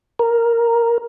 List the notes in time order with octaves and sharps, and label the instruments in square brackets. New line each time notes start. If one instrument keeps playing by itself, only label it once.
[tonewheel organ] A#4